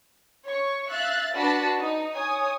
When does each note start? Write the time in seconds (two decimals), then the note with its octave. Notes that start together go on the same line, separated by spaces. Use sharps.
0.46 C#5 C#6
0.88 E5 F5 F#6 A6
1.35 D4 F#4 B4 A5 B5 A6
1.78 D#4
2.15 C#5 G#5 D#6